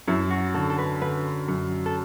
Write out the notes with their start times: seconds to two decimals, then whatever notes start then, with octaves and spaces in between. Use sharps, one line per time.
0.07 F#2 E4
0.31 F#4
0.54 D3 A4
0.70 A4
0.79 B4
1.02 D3 B4
1.48 F#2
1.86 A4